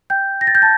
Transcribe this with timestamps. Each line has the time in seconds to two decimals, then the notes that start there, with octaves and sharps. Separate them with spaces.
0.10 G5 G6
0.41 A#6
0.47 A6
0.55 G6
0.62 A5 A6